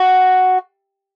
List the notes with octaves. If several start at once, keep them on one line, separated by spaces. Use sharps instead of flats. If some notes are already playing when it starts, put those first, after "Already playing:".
Already playing: F#4